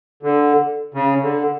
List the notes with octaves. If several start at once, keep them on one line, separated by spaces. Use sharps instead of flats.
D3
C#3
D3